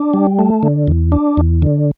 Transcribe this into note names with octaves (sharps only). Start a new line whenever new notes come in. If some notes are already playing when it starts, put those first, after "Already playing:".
Already playing: D4
G3
A3
D3
E2
D4
E2
D3